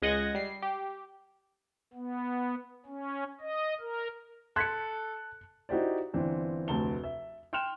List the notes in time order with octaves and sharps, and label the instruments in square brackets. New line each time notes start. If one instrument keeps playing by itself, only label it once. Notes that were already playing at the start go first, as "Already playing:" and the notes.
[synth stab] C#2 G#3 D#5 F#5 G#6 A#6
G3 C7
G4
[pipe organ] B3
C#4
D#5
A#4
[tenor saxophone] A4 [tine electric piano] A5 [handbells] C6 G#6 B6 [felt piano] F#6 C#7
[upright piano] D#4 E4 F#4 G4 C5 D5
G1 E3 C4 D4
F1 D2 A5 G7
E5
G5 C6 F6 F#6 E7 F7